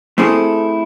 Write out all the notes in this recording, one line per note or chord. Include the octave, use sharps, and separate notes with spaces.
A3 C4 E4 G#4 A4